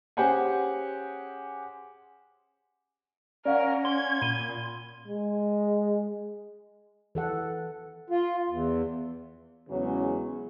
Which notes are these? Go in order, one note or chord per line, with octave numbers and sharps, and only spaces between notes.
C#4 G4 G#4 C5 F#5 G#5
C#4 A#4 D5 F5 F#5
C6 G#6 G7
A#2 B5 D#7 G7
G#3
E3 A4 F#5
F4
E2
E2 C#3 E3 F#3 G#3 C#4